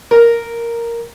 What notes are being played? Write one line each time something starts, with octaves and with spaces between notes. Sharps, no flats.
A#4 A#5